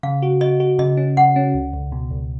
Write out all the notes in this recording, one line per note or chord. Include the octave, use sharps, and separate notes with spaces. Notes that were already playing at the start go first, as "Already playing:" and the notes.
C#3 F5
F#4
F#4 D#5
F#4
C#3 D#5
C#4
C#3 F#5
C#4
C#2
C#2
B2
C#2